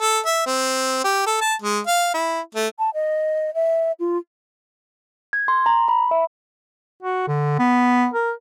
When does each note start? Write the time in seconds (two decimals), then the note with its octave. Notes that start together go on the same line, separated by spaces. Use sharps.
0.01 A4
0.26 E5
0.46 C4
1.04 G4
1.26 A4
1.41 A5
1.62 G#3
1.87 F5
2.14 E4
2.55 A3
2.79 A5
2.94 D#5
3.54 E5
4.00 F4
5.33 G#6
5.48 C6
5.66 A#5
5.88 B5
6.11 E5
7.02 F#4
7.28 D3
7.59 B3
8.14 A#4